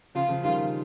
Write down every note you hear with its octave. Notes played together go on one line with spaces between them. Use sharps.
C#3 F3 F4
C#3 F3
D#3 G3 F4